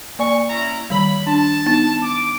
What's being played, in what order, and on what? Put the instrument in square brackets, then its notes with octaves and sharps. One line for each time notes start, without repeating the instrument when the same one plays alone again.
[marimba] A#3 D5 G#5 [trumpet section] C#6
[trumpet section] C#4 E4 A#5
[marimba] D#3 G3 [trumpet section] B5
[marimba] D4 [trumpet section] A5
[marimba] B3 D#4 A6
[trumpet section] D6